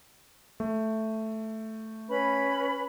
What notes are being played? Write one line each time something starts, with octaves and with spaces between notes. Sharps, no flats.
A3
C#4 B4 B5